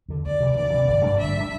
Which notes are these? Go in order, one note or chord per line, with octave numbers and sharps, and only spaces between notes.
E2 D3
D2 D5
C3 E3
D2 D5
C3 E3
G1
G2 G3 D4
G1 E5
G3 D4